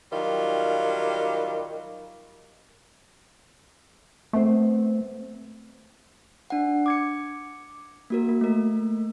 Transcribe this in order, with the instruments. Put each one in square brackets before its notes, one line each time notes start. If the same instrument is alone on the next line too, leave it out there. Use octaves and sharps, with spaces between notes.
[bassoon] D#3 [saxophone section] F#3 G3 F4
[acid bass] A3 [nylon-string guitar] B3 C4 C5
[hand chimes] D4 F#5
D6 G#6 C#7
A#3 F#4 A#4
A#3
A3 A#4